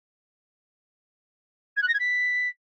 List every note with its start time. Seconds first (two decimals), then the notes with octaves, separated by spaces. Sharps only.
1.76 G#6
1.82 F#6
1.88 A#6
1.93 G#6
1.99 B6